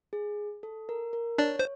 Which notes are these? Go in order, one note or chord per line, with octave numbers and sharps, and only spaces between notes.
G#4
A4
A#4
A#4
D4 C#5 D5
C5